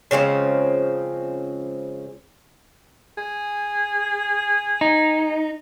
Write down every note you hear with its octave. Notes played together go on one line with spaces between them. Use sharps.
C#3 F3 G#3 C4
G#4
D#4